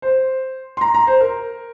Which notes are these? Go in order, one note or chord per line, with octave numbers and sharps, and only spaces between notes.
C5
C6
A#5
A#5
C5
A#4